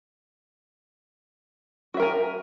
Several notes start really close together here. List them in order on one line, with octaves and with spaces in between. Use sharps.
F#4 E5 A#4 G#5